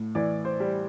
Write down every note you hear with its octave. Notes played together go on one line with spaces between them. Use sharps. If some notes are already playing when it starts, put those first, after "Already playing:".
Already playing: A2
E3 D5
C5
G3